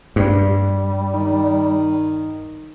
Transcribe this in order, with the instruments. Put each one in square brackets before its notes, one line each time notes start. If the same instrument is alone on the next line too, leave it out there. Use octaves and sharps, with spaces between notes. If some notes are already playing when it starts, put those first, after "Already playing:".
[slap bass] G2 [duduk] G3
[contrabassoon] D#3